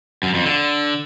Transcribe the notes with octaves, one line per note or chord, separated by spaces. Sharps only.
F#2
F2
D3